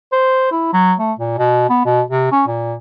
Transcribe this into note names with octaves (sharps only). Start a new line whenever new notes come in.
C5
E4
F#3
A3
A#2
B2
B3
B2
C3
C#4
A#2